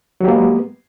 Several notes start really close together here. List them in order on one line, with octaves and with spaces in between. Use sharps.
F#3 G4 A#3 G#3 B3